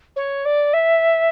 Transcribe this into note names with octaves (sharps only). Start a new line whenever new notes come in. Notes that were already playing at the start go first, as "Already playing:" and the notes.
C#5
D5
E5